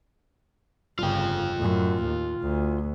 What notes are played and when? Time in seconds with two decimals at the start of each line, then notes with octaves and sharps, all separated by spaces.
0.99 G1 C#3 F4 G5
1.58 F#2 A2
2.03 D#2
2.40 D2